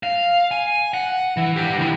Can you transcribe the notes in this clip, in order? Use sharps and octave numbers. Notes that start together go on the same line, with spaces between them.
F5
G#5
F#5
E3
G4 B4
D#3 E4